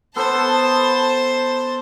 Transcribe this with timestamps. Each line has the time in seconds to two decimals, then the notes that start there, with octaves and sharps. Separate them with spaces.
0.16 B3 A4 C5 A5